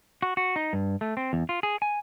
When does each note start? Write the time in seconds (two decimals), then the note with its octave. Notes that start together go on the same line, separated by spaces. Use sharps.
0.22 F#4
0.37 F#4
0.56 D#4
0.73 G2
1.01 A3
1.17 C4
1.33 E2
1.49 F4
1.63 G#4
1.82 G#5